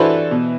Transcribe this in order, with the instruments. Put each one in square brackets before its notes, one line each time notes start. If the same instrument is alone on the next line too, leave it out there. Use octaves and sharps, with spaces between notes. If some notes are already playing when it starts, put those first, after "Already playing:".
Already playing: [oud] E3 E4 [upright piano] D4 F#4 A4 C5
[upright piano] B2